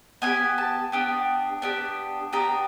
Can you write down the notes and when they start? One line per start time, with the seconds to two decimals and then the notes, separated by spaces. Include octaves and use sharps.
0.22 B3 D4 G4 G#5
0.58 A5
0.92 B3 D4 G4
1.62 B3 D4 G4
2.33 B3 D4 G4 A#5